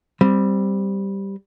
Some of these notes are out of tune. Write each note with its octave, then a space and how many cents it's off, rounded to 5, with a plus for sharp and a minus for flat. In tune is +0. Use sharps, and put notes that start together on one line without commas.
G3 +0 C4 +0